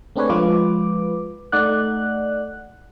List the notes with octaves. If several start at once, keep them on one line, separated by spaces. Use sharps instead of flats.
A3 C4 D4 G#4 B4 C#5
F3 G#3 F4 B4 D6
A3 D#4 D5 F#5 F#6